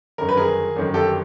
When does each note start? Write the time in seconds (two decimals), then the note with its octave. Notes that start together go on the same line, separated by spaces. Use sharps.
0.18 G1 F#2 D#3 A#4
0.29 B4
0.37 G#4 A#4
0.76 G1 F#2 D#3
0.94 G4 A4